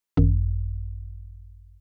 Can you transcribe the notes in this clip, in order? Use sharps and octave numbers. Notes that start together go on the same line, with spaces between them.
G#1 F#2